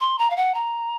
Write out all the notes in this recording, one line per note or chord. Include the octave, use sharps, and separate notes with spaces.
C6
A#5
F5
F#5
A#5